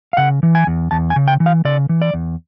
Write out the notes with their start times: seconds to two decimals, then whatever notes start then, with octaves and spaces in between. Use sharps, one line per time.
0.13 F5
0.17 C#3 F#5
0.43 E3
0.55 G#5
0.67 E2
0.91 E2 A5
1.10 G#5
1.16 C#3
1.28 G5
1.40 E3
1.46 F5
1.65 C#3 D5
1.89 E3
2.02 D5
2.14 E2